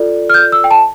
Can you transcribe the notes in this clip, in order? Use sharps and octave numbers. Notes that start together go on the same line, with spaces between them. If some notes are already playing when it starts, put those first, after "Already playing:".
Already playing: F4 A4 D5
F6
G6
E6
G5
A5